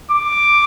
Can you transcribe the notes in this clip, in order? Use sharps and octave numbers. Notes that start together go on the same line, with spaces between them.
D6